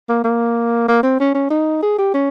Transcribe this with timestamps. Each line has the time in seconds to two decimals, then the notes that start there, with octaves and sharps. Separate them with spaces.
0.09 A#3
0.24 A#3
0.88 A#3
1.03 C4
1.20 C#4
1.35 C#4
1.50 D#4
1.83 G#4
1.98 G4
2.14 C#4